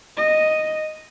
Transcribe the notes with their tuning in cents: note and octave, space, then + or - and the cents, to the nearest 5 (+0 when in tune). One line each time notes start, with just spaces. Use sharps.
D#5 -5